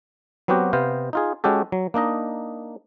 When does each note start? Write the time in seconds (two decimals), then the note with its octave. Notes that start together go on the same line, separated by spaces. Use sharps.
0.48 F#3 B3 C4 F#4 G4
0.73 C3 B3 C5 F5
1.13 D#4 F4 G#4
1.44 G#3 C#4 F#4 G4 A4
1.72 F#3
1.94 A#3 D4 D#4 D#5